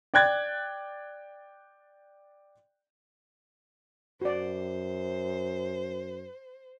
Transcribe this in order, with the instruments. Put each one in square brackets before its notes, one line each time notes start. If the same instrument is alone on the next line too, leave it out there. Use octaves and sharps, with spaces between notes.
[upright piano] D5 G5 F#6 G#6 A6
[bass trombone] F#2 [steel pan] F#4 D5 [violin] C5